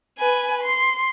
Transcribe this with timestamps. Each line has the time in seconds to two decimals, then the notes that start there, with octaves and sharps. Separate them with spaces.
0.18 B4 G#5
0.63 C6